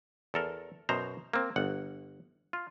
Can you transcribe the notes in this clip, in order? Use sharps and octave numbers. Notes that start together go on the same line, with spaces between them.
E2 A4 A#4
F#2 B2 C5 A#5
A#3 C4
G1 F#5
F4